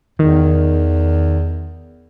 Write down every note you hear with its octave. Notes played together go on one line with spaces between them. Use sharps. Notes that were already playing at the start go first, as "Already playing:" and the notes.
E2 D#3